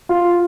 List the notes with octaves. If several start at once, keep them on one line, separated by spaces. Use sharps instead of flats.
F4